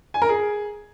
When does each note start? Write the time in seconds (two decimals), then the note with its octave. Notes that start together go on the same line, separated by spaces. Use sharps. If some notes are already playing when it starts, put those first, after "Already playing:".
0.14 G#5
0.22 A#4
0.29 G#4